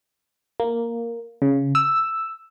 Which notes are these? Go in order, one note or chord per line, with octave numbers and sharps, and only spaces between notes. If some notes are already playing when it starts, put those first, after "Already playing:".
A#3
C#3
E6